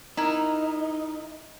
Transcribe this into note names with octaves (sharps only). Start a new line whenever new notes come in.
D#4 E4 A#4